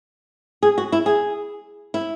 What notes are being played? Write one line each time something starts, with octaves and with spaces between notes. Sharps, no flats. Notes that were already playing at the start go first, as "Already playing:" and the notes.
G#4
F#4
E4
G#4
E4